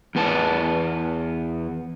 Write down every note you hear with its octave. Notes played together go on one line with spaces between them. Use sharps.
E2 B3 A5